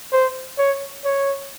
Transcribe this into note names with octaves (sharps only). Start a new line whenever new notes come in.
C5
C#5
C#5